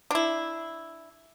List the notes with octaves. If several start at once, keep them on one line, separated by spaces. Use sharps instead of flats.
D4 E4